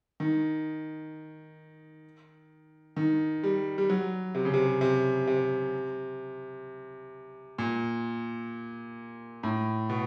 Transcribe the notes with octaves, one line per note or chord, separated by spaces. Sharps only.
D#3
D#3
G3
G3
F#3
C3
C#3
C3
C3
C3
A#2
A2
B2